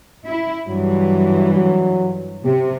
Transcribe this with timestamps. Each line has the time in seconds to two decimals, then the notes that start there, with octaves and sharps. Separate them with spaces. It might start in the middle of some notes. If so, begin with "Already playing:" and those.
0.25 E4
0.68 G2 E3 F#3
1.55 F#3
2.45 C3 G4